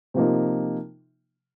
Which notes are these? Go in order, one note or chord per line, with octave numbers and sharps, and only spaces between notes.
C3 F3 A#3 D#4